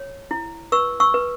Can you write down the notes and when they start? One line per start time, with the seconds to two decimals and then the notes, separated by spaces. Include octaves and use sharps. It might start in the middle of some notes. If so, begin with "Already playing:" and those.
Already playing: C#5
0.31 E4
0.72 B4 C#6 E6
1.00 C#6 E6
1.14 B4